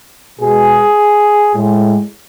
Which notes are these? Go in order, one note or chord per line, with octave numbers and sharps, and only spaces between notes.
B2 G#3 G#4
A2 G#3